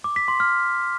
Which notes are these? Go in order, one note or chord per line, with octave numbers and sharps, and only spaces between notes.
D6
B6
C6
F6